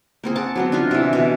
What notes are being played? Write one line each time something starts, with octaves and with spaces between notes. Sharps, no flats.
A#3 C4 G#4
F#5 A5 D6
F#3 B3 C4
D4 D#4 F4 E5
C3 E3
B2 E3